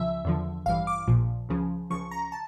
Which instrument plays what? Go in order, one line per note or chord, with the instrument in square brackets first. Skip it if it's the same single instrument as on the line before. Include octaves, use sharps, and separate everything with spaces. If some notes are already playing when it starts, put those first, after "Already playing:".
Already playing: [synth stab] C#2 C#3 F3 E5
E2 D3 F3
A1 G2 E3 F5
D6
A#1 A#2 F3
C#2 C#3 F3
C#2 C#3 F3 C#6
A#5
A5